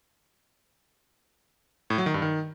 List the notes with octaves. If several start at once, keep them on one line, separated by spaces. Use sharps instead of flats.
A2
F#3
D#3
G2
D#3